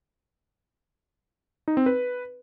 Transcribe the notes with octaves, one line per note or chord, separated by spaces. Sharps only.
D#4
C4
B4